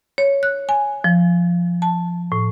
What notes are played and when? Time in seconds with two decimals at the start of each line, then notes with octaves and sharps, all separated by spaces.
0.18 C#5
0.43 F#6
0.69 G#5
1.04 F3
1.82 A5
2.32 A2